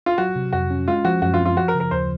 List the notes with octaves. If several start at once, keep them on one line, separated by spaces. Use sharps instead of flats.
F4
F#3 F#4
C3
F2 F#4
C#4
G#3 F4
F3 F#4
F#2 F#4
F4
C4
F4
F3 F#4
A#4
C#3
A#4
D#2 C5